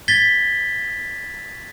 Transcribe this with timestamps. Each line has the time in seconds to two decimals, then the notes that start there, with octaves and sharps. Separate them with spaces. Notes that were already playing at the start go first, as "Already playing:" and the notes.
0.08 G#6 A6 B6 G7